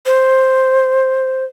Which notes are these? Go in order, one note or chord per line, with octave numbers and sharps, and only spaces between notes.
C5